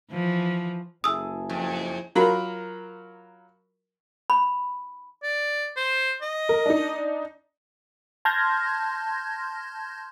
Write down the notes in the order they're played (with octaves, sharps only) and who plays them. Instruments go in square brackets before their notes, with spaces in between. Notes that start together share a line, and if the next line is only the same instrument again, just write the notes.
[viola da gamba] E3 F3
[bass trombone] F#1 [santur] E4 G#4 A4 [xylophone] D#6 E6
[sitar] F2
[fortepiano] F#3 F4 A#4 B5
[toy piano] B5
[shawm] D5
C5
D#5
[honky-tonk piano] A#4
D4 D#4
[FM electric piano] A5 C6 F6 G6 G#6 A#6